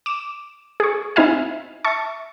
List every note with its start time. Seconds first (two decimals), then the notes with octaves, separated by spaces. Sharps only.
0.06 D6 E7
0.80 G#4 C#6
1.16 C4 D#4 E4 E5 F5 G#5
1.85 E5 A5 C#6